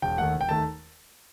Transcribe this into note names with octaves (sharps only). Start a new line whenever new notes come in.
E1 G5
D#2 D#3 A3 F#5
E1
G5
D#2 D#3 A3 A5